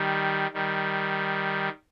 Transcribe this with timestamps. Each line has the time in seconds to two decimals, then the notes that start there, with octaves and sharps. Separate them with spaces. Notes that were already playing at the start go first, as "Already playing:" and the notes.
Already playing: D#3 G3
0.53 D#3 G3